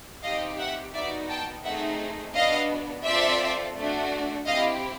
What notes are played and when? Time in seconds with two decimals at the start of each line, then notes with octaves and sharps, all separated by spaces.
0.23 C4 D#4 G4 D#5 F5
0.59 E5 F#5
0.94 B3 D#4 F#4 D5 E5
1.29 G5 A5
1.65 A3 C4 D#4 G#4 E5 F#5
2.35 B3 D4 F#4 D#5 F5
3.05 C4 F4 A4 D5 E5
3.76 A3 D4 F#4
4.47 C4 E4 G4 D#5 F5